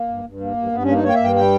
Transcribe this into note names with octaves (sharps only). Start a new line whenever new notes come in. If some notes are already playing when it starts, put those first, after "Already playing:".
Already playing: A#3
G2
G2
A#3
G2
G2 B3
C#4
A#3 D#4
A#3 C#5
G5
G2 E5
G5
G3 G5